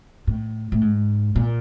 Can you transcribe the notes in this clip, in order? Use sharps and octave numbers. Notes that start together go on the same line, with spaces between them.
A2
A2
G#2
A#2